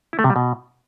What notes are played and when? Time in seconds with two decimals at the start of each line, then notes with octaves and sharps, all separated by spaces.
0.13 E4
0.19 A3
0.24 C3
0.30 G3
0.36 B2